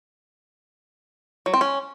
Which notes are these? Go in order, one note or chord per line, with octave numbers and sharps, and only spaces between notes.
F#3
C4
C#4